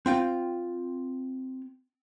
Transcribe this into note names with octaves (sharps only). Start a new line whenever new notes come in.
C4 F4 G5